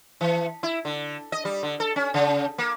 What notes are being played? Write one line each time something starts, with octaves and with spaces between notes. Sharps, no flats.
E3
E4
D3
D#5
G3
D3
A4
C#4
C#3
A#3